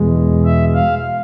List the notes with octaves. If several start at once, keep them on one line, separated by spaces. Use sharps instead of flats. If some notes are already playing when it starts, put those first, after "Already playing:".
Already playing: E2 B2 G#3
E5
F5